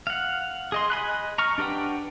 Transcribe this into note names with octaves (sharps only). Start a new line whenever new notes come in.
F5 F#5
G#4 D#5 C6
D#5 G#5 B5 F#6
A#5 C#6 F6
D4 G4 B4 F#5 G5